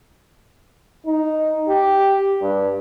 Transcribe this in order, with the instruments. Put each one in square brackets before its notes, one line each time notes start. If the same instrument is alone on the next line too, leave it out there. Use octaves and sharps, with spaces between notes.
[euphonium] D#4
G4
G2